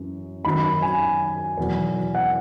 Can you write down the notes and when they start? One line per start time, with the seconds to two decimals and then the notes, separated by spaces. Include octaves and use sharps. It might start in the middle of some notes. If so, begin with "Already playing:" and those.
Already playing: F#2 E3
0.44 F#2 D#3 F#3 B5
0.82 G#5
1.57 E2 B2 F#3
2.15 F#5